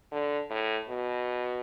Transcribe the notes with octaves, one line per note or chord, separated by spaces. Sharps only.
D3
A2
B2